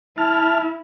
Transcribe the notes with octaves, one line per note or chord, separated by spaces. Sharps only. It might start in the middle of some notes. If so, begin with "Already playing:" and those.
E4 A5 F6